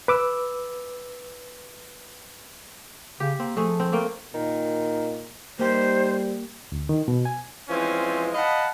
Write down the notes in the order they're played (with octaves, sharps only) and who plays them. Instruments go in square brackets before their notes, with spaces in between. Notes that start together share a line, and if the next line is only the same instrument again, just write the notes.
[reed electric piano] B4 D6 E6
[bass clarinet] C#3 [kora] G4
[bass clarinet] A#3 [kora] C4
[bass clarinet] F3 [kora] A3 G#4
[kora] C4
A3 A#3 G5
[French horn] A#2 [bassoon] D#3
[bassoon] D#3 [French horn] G3 [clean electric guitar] A#3 G4 [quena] C5
[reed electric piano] D2
D#3
B2
G#5
[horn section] E3 F3 G#3 C4 C#4
D#5 F5 F#5 A5 B5